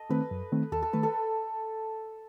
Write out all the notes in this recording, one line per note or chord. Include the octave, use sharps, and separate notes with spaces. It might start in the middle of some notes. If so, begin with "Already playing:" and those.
Already playing: A4 D#5
D#3 A3 C4 B4
F#2
D#3 A3 C4
D#2 A4
A4
D#3 A3 B4
A4